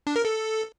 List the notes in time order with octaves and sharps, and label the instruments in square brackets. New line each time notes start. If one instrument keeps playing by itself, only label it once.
[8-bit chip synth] D4
A#4
A4